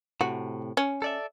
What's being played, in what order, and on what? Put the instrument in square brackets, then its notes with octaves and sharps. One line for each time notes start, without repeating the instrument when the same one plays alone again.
[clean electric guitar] A2 C3 [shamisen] F#4
[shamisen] C#4
[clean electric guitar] A4 D5 E5